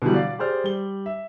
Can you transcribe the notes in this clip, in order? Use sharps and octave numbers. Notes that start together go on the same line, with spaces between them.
B2 D3 E3 F#3 G3
D5 F5
G4 G#4 C5 D5 F6
G3 G7
E5